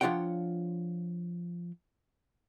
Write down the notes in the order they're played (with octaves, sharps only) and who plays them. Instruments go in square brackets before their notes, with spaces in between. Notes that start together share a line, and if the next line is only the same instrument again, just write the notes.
[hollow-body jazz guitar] F3 D4 F4 C#5 F#5 G5